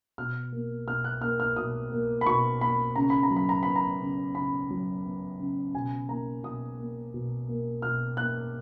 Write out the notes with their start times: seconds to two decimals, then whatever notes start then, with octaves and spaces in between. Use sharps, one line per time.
0.18 B2 F6
0.52 A#3
0.88 B2 F6
1.04 F#6
1.21 A#3 F6
1.40 F6
1.56 B2 D#6
1.92 A#3
2.21 B5
2.26 B2 C#6
2.61 A#3 B5
2.96 C#3 A#5
3.10 B5
3.23 A#5
3.31 F#3
3.36 B5
3.49 A#5
3.63 B3 B5
3.76 A#5
4.00 C#3
4.35 C#3 B5
4.70 F#3
5.05 B3
5.39 C#3
5.74 B2 G#5
6.08 A#3 A#5
6.43 B2 D#6
6.78 A#3
7.14 B2
7.49 A#3
7.82 B2 F6
8.17 A#3 F#6